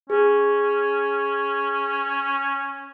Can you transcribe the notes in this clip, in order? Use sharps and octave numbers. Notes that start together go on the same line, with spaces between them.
C#4 G#4